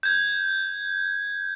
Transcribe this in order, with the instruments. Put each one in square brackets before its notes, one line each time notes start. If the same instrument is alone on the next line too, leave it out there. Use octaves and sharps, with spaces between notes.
[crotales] G6 G#6